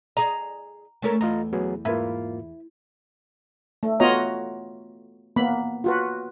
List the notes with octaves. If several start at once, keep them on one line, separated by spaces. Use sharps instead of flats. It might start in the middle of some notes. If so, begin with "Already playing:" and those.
G#4 D#5 A#5
A3 C#4 A#4
E2 F4 D#5 A#5
F#3 B3 G#4
G#2 A#3 E4 F4 B4
A3
B3 F4 F#4 C#5 D#5 A#5
A#3 B3 B5
F4 F#4 B4